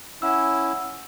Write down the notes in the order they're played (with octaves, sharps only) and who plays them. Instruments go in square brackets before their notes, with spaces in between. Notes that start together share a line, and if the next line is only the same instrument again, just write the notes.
[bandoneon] C#4 E4 [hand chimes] F#5 E6